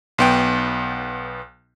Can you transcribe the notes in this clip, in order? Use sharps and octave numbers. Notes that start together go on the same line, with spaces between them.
B1 B3 G5